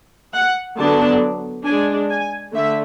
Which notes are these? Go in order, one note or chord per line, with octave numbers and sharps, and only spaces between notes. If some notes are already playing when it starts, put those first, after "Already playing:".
F#5
D3 F#3 B3 D4 A5
G#3 D4 G#5
G#5
D3 A3 E5